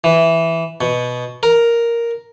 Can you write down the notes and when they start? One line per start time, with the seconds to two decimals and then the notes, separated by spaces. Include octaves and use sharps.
0.04 E3
0.81 B2
1.43 A#4